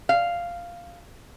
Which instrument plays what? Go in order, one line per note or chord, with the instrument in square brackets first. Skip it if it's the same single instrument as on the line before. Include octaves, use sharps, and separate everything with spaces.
[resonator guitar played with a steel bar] F5